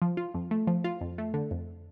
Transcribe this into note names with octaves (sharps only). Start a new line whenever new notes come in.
F3
F4
F2
A3
F3
F4
F2
A3
D3
F2